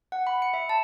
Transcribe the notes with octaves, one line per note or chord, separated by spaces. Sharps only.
F#5
B5
C#7
E5
A5